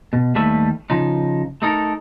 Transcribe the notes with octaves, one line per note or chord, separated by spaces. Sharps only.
B2
D#2 G3 A3 B4 E5
C#3 F3 D#4
A3 D#4 A4 A#4